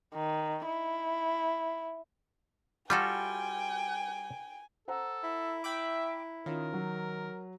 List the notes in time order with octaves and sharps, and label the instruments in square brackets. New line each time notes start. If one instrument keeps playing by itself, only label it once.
[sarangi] D#3
E4
[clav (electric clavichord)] G3 [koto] F4 F#4 A4 [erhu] G5 [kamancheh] G#5
[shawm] A4 [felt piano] C5 F#5 A#5
[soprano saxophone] E4
[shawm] E5 [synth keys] G5 B5 D6
[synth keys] D#3 [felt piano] C#4 F4 [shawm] A#4
[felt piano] F#3